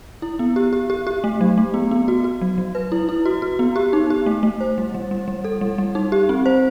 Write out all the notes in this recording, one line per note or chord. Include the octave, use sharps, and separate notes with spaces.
E4
B3
G4
G4
G4
G4
A3
F#3
A3
B3
B3
F#4
F#4
F#3
F#3
B4
E4
E4
F#4
F#4
B3
G4
D#4
G4
A3
A3
C5
G3
G3
G3
G3
A4
G3
G3
D#4
G4
C4
C5